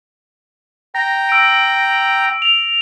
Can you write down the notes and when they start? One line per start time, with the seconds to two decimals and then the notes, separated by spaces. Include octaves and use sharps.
0.95 G5 A#5 A#6
1.29 E6 D7
2.42 F7